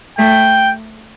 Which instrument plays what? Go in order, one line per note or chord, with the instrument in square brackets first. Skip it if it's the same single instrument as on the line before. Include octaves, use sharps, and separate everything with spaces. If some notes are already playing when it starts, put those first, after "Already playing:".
[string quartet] A3 [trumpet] G5